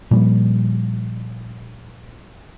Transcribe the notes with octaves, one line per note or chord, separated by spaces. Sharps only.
A#2 F3 G3